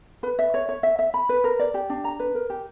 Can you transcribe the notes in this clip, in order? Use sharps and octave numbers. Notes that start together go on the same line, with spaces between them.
B4
E5
C#5
C#5
E5
E5
B5
B4
A#4
D5
G4
D4
A#5
B4
A#4
G4